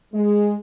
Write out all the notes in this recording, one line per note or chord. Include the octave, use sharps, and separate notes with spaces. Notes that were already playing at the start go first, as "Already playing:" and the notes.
G#3